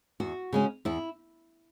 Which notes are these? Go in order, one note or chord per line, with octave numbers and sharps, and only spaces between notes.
E2 F#4
C#3 G#3 C#4
E2 E4